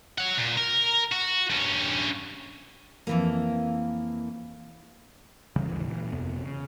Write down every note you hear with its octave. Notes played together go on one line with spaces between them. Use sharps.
C#5 F#5
A#2
A#4
F#4
G2 C#4
F2 E3 A#3
C#3 E3 G3
A1 D#2 G#2 E3
A#2 E3
G1 F2 C3 B3
C#3